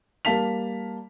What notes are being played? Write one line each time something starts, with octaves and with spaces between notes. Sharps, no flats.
G3 A#3 F5 A5 B6 F7